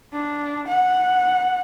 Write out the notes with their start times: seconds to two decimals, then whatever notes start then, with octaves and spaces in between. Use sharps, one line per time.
0.13 D4
0.68 F#5